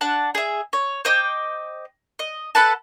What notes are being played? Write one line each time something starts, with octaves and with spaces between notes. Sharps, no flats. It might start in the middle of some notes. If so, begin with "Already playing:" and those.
D4 F#5 A5
G#4 E5
C#5
C5 D#5 G5 D6
D#5
A4 B4 F#5 A5